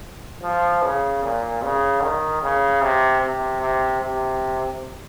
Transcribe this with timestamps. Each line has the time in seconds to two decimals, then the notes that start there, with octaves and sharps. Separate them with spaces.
0.43 F3
0.83 C#3
1.23 A#2
1.63 C#3
2.03 D#3
2.42 C#3
2.82 C3
3.22 C3
3.61 C3
4.01 C3